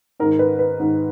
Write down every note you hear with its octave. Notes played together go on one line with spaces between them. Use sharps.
G#2 D#3 A#4
B4
B4
G#2 D#3